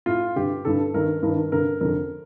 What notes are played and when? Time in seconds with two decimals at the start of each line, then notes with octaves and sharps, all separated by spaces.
0.06 A2 F4
0.36 G2 D3 G4
0.65 G2 D3 A4
0.94 G2 D#3 A#4
1.23 G2 D#3 A#4
1.52 G2 D3 A#4
1.81 F2 D3 A#4